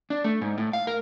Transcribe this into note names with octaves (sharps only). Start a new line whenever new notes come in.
D4
A3
G#2
A2
F5
A#4